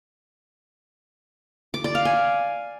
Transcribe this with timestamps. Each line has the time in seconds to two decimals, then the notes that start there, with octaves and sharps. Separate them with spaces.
1.74 D6
1.84 D5
1.95 F5
2.05 G#5